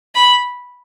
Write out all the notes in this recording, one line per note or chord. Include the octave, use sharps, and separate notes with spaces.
B5